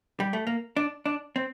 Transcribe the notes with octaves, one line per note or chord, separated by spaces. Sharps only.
G3
A3
A#3
D4
D4
C4